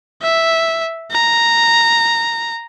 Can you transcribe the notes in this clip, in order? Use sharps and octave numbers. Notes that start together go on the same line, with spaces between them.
E5
A#5